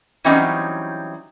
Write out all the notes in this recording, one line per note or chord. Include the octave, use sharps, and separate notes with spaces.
E3 F#3 G3 C4 C#4 D#4